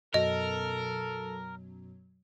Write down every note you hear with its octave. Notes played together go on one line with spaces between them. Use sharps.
F#2 B2 F#3 A4 A#4 D#5